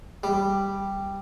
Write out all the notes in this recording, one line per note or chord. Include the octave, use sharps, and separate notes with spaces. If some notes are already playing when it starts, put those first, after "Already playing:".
G3